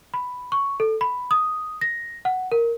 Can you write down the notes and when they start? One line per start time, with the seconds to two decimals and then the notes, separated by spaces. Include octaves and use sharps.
0.14 B5
0.52 C#6
0.80 A4
1.01 B5
1.31 D#6
1.81 A#6
2.25 F#5
2.52 A#4